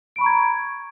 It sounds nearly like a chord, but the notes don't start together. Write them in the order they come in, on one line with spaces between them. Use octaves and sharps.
D7 B5 C#6 A#5 G#6